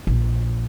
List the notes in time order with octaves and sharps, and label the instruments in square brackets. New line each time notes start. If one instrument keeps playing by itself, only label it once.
[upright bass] A#1